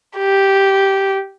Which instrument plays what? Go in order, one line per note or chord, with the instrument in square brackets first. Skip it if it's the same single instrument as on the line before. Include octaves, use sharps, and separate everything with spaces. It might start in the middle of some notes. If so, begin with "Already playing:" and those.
[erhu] G4